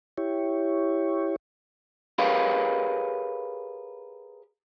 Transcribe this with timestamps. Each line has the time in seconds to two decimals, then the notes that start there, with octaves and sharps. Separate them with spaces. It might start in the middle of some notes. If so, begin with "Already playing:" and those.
0.18 E4 G4 C#5
2.18 G4 G#4 A#4 B4 C#5 F5